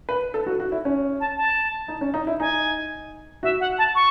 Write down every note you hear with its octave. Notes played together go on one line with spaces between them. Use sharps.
B4
A4
F#4
F#4
E4
C#4
A5
A5
D#4
C#4
D#4
E4
D#4 G#5
F#4 E5
F#5
A5
C#6